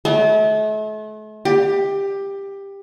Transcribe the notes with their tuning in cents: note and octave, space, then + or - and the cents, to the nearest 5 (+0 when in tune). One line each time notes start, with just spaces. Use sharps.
A3 -40
G4 +15